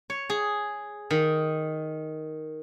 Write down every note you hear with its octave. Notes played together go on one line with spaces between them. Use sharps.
C#5
G#4
D#3